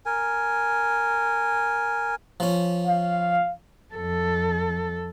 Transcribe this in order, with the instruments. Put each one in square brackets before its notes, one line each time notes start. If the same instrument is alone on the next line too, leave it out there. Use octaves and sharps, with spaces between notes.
[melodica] A#4 G#5
[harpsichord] F3 C#4
[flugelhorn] F5
[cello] F2 A4